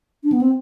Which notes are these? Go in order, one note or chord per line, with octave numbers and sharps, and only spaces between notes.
D4
B3
C4